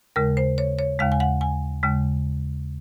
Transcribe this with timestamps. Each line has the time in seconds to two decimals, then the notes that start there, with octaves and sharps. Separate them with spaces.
0.16 D#2 C#3 G#3 A#4
0.37 C5
0.58 C#5
0.79 C#5
0.99 D#2 C#3 G#3 F5
1.12 G#5
1.20 F#5
1.41 G#5
1.83 D#2 C#3 G#3